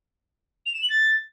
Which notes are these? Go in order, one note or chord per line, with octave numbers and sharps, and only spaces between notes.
F7
E7
F#7
A6